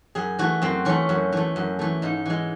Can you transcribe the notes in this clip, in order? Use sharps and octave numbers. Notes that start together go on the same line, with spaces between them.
F#2 G#4
E3 A3 F#4
F#2 C4
E3 A3 C#4
F#2
E3 A3
F#2
E3 A3
G#2 D#4
E3 G#3